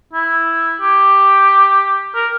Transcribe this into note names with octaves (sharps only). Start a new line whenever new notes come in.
E4
G4
A#4